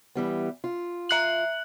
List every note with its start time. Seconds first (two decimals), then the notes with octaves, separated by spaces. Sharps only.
0.15 E3 G3 B3
0.64 F4
1.09 E5 F#6 F#7